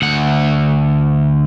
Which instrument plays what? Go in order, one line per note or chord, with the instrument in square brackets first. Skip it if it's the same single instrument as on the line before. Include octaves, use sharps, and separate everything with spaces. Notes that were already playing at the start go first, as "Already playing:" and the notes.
[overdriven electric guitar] D2 F#5